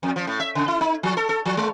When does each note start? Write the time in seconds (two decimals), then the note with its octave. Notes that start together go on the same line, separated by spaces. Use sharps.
0.03 F2
0.16 F3
0.27 A2
0.40 E5
0.55 C#3
0.68 E4
0.81 D#4
1.03 F3
1.17 A4
1.29 A4
1.45 F3
1.57 G#3